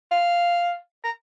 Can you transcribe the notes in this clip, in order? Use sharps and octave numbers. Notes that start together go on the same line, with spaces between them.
F5
A#5